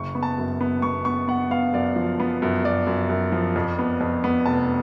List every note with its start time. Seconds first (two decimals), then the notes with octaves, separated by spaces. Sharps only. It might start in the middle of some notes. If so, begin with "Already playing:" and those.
Already playing: F#1 C#6
0.15 B3
0.23 A5
0.38 F#2
0.61 B3
0.82 B3 C#6
1.05 B3 C#6
1.28 B3 F#5
1.51 B3 F5
1.73 F#2 D5
1.96 F3
2.20 B3
2.42 F#2
2.64 F#2 D5
2.87 F#2
3.09 F#2
3.32 F3
3.56 F2
3.79 B3
4.01 F2
4.24 B3
4.46 F1 A5